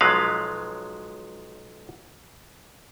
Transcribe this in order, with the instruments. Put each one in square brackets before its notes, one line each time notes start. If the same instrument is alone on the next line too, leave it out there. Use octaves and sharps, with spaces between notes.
[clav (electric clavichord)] B1 F3 F#3 G#3 B4 F5